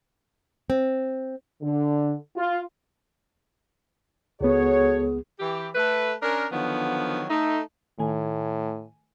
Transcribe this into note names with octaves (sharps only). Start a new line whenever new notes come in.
C4
D3
F4
C#2 B3 F#4 G#4 A4 C#5
E3 G4
A3 B4
C#4 D4 A#4
D3 D#3 F3 F#3 B3
A3 D#4
A2 D#3 A3 G#5